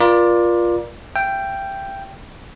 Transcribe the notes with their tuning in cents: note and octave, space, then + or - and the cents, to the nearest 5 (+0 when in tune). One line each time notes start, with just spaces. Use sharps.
F4 +0 A#4 +35 D5 +5
E5 +40 G5 +0